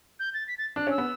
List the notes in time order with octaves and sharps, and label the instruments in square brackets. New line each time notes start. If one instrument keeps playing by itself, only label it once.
[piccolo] G6
A6
B6
A6
[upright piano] D4 [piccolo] F#6
[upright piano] C#4 [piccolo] E6
[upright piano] B3